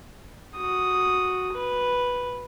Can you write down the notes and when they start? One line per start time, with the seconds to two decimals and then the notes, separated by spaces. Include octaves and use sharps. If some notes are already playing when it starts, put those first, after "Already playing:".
0.57 F#4 D#6
1.53 B4